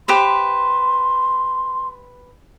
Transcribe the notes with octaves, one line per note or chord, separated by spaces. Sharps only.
G4 B4 C5 C6